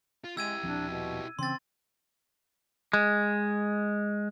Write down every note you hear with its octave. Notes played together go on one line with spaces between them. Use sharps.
F4
G#3 E4 G4 E6 G#6 D#7
D#1 F3 C4 D4
B2
C#3 E3 C4 C#4 C6 A6
G#3